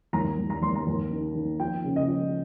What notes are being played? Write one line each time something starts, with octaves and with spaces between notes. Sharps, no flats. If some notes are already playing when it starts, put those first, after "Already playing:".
D#2 A#5
D#2
A#5
D#2 C6
A#5
D#2
D#3
D#3
F3 G5
C#3
D#5
F3